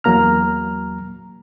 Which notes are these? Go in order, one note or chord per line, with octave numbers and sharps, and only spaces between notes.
E2 F#3 A#3 A#5 F6